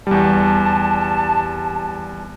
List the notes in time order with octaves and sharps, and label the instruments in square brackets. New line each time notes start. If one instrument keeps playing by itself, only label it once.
[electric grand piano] E2 G3 [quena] A5